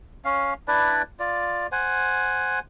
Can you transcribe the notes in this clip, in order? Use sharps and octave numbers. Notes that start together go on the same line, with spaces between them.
C#4 F5
D4 E4 B4 D5
F4 D5
C5 F#5 G#5